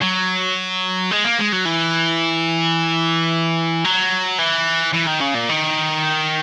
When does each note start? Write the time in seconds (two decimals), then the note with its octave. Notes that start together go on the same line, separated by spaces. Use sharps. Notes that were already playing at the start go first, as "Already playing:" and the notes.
0.02 F#3
1.11 G#3
1.25 A#3
1.39 G#3
1.53 F#3
1.65 E3
3.85 F#3
4.39 E3
4.94 E3
5.07 D#3
5.21 C#3
5.35 A#2
5.49 D#3